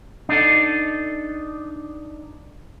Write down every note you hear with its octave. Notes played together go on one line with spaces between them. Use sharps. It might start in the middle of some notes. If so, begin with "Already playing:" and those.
D4 D#4 A4